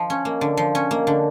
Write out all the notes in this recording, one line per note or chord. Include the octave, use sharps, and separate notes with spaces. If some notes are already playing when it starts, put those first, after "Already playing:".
Already playing: F3
C#4
A#3
D3
F3
C#4
A#3
D3